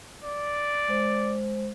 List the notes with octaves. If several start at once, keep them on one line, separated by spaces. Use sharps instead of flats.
D5
G#3 C5